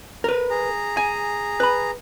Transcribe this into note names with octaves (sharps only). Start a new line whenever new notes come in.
A#4 B4
G#4 A#5
G#5
B4 B5